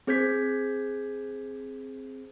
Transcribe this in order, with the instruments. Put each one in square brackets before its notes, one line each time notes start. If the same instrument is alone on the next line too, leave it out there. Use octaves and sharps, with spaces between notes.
[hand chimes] C4 G#4 C5 G6 G#6 B6